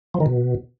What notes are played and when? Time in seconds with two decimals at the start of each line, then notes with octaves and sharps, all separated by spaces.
0.14 F3
0.20 D#3
0.26 B2